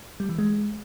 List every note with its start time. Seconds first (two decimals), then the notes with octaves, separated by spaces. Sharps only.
0.20 G3
0.29 E3
0.38 G#3